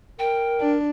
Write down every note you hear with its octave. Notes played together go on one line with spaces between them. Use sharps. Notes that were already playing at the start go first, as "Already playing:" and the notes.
A#4 G5
D4